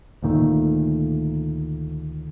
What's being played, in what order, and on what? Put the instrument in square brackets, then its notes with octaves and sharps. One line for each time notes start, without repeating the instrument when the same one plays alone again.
[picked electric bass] D2 A#2 D#3 A3